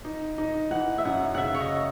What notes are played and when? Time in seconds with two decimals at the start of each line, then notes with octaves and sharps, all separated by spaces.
0.05 D#4
0.38 D#4
0.71 E3 F#5
0.98 E5
1.05 F#2 F#5
1.35 F#5
1.38 C#3 E5
1.55 C#5
1.60 D#5